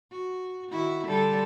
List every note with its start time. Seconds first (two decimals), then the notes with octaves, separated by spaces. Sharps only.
0.11 F#4
0.71 D#3 E4 F#4
1.06 D3 G3 A4